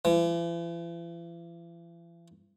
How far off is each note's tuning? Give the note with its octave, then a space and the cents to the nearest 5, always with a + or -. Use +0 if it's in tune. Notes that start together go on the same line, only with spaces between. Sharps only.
E3 +45